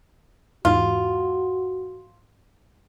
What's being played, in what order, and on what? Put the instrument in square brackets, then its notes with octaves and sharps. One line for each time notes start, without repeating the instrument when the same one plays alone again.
[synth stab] E2 G#2 [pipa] F4 [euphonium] F#4